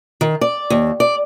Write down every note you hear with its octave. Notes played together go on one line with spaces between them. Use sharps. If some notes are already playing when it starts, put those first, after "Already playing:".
D#3
D5
D#2
D5